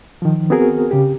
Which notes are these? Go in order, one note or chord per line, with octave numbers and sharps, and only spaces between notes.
D#3 F3
B3 C4 F#4 G#4 A#4
C#3 G4